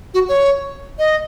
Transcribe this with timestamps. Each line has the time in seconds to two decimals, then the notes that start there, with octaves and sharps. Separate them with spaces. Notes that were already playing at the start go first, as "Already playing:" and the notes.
0.14 F#4
0.29 C#5
0.99 D#5